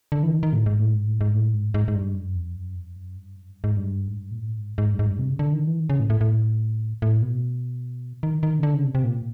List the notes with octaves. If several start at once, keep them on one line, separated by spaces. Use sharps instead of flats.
D3
E3
D#3
D#3
A2
G#2
A2
G#2
A2
G#2
A2
G#2
G#2
G#2
G2
F#2
F2
F#2
F2
F#2
G2
F#2
G2
G#2
G2
G#2
G2
A#2
A2
G#2
G#2
G2
G#2
G2
C3
C#3
D3
D#3
E3
D#3
C#3
A2
A2
A2
A2
B2
D#3
D#3
C#3
D3
C#3
C3
C3
A#2